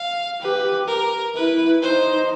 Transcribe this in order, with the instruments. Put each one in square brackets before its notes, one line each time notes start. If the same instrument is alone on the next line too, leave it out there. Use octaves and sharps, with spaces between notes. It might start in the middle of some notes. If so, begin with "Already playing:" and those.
Already playing: [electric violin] F5
[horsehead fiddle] G4 [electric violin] B4
[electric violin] A#4
[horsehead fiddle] E4 [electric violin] B4
[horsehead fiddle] D#4 [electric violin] C5